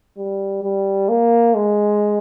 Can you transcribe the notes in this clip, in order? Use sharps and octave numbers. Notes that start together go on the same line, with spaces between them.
G3
G3
A#3
G#3